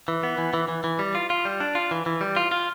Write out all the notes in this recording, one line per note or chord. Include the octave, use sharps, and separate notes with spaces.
E3
B3
E3
E3
E3
E3
G3
F4
F4
G3
D4
F4
E3
E3
G3
F4
F4